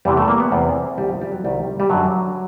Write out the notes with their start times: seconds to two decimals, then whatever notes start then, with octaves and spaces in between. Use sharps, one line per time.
0.05 E2 C3 E3 G3
0.17 A3
0.28 A#3
0.40 B3
0.52 E2 C3 E3 C4
0.98 C2 C3 D#3 G3
1.09 F3
1.22 G3
1.32 F#3
1.44 C2 C3 D#3 G3
1.80 G3
1.90 F#2 D3 F#3